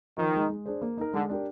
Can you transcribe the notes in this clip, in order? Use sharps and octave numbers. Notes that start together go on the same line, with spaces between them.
D#3 F3
G#3 D#4
G#3
D4 G#4 C5
A#3
D#4 A#4
D3 G#3
D4 G4 A#4